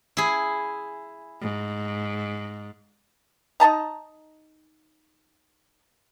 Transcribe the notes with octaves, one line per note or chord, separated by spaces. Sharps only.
E4 G#4
G#2
D#4 D#5 A5 A#5